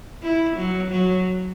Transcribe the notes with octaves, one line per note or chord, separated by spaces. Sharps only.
E4
F#3
F#3